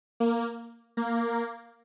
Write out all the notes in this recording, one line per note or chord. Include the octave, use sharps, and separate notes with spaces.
A#3
A#3